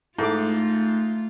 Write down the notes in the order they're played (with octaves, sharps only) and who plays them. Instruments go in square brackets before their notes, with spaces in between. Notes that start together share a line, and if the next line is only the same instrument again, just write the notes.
[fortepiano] G#2 [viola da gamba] A3 F4 [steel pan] E4 A4 D6